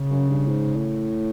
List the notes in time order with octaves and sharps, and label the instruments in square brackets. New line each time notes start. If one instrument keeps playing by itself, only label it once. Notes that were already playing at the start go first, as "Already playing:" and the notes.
Already playing: [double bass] C#3
[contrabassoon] F#2
G2
G#2
A2